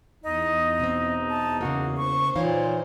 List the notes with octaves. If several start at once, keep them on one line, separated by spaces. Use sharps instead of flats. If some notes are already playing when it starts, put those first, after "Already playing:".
E2 D#4 D#5
B2 C4
A5
C#3 A#3 F#4
C5 C#6
A#2 E3 D#4 C#5 F5